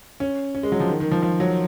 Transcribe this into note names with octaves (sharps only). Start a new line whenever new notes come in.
C#4
C#4
G#3
F#3
F3
D#3
D#3
F3
F3
F#3